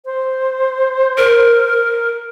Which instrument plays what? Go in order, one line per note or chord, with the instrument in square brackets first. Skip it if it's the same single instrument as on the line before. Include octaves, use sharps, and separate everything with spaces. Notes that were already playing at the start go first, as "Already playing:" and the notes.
[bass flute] C5
[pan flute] A#4